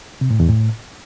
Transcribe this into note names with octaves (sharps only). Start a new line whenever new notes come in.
C3
A2
E2
A2